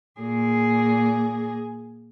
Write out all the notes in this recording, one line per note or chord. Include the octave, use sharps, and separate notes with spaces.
A#2 G#4